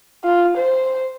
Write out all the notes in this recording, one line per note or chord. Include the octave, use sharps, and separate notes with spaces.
F4
C5